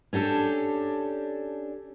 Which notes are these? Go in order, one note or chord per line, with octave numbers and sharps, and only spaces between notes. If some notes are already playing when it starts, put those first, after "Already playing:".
C#4 D4 G4 A4